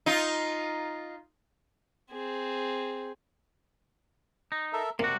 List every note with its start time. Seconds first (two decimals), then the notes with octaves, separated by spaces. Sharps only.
0.06 D#4 F4
2.11 C4 G#4
4.52 D#4
4.73 A4 A#4 E5
4.99 C3 A#3 F#4 D5